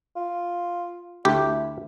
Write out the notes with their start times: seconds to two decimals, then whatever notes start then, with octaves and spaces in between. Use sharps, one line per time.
0.16 F4
1.25 D2 E4 G4